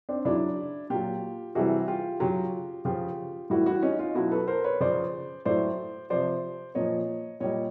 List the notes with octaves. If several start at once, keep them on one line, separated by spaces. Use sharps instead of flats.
C4 D4
C#3 F#3 D4 E4
A#2 F#3 F4 G4
C3 E3 G3 F#4 G#4
F4 G4
C#3 F#3 F4 G4
C#3 F3 F4 G4
A2 E3 G3 E4 F#4
E4 F#4
C#4 D#4
D#4 F4
B2 F#3 E4 F#4
A4 B4
A#4 C5
B4 C#5
C#3 F3 C5 D5
A2 F#3 C5 D5
C3 F3 C5 D5
A#2 F3 C#5 D#5
A#2 G3 C#5 D#5